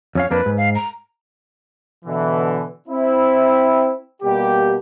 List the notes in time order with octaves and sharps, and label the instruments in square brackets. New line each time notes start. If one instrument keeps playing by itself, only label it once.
[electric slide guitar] F2 C#4 F5 [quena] C#5
[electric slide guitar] F2 A#3 D4 [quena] B4
[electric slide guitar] G#2
[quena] F5
A#5
[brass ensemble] B2 D3 E3
C4 E4
B2 G3 A#3 G4